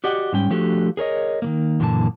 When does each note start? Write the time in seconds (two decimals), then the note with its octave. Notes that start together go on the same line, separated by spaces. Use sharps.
0.04 F#4 G4 D5 D#5 F#5
0.33 G#2 G3 C#4 G5
0.50 F3 A3 D4 F#4 G4 A4
0.97 G#4 A#4 C#5 D#5
1.42 D#3 E3 A#3
1.80 F#2 A#2 D3 E3 A#3 A5